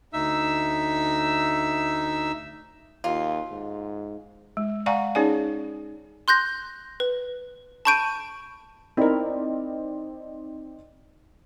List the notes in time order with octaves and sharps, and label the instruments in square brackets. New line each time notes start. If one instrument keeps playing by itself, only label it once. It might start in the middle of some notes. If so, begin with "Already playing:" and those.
[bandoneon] D2 D#4 E5 E6
[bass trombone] D#2 [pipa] F4
[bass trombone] G#2
[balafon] G#3
D5 F5 F#5 G#5 A#5 C#6
C#4 D#4 G#4 C#5 D5 G#5
[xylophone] C6 F#6 G6 A#6
B4
A5 B5 C#6 G6 D7 D#7
[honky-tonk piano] C4 D#4 D5 [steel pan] E4 A#4